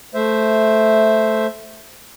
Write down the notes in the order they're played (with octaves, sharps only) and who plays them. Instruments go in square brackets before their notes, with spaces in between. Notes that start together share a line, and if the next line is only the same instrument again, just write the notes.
[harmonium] A3 C5 E5